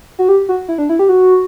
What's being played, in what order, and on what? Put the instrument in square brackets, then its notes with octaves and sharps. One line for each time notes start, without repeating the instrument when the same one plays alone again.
[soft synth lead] F#4
G4
F#4
E4
D4
E4
G4
F#4